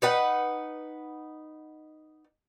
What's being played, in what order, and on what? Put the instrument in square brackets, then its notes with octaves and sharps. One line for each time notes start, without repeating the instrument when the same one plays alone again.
[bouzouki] D#4 B4 F#5